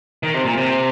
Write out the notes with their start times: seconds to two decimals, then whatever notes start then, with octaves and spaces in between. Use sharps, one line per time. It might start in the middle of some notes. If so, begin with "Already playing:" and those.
0.23 D#3
0.34 C3
0.45 A#2
0.57 C3